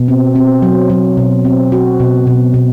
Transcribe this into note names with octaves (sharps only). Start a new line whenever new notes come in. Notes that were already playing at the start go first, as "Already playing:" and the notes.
Already playing: B2
C4
C4
F#3
F#3
B2
C4
F#4
B2
B2
B2